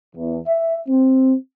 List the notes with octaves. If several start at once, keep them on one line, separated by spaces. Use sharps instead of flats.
E2
E5
C4